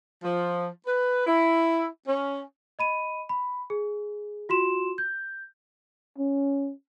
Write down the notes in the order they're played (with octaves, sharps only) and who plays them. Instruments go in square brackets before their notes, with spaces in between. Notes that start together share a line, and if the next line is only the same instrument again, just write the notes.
[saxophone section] F3
B4
E4
C#4
[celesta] D#5 B5 D#7
B5
G#4
F4 F#4 C6 E7
G6
[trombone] C#4